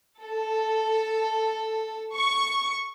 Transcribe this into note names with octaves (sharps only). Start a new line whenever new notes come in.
A4
C#6